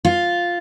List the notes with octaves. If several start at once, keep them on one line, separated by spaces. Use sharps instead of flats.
F4